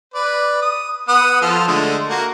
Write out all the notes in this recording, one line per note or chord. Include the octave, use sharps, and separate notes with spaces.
B4 D5
D#6
B3 F#5 D#6
F3 F4 A4
D3 G#3 A3
A#3 F#4